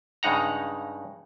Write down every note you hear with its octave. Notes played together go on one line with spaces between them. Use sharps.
G2 C#3 G#3 D#4 F#5 A#5